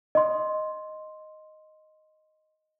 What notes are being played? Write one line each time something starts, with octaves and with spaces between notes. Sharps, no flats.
D#5 C6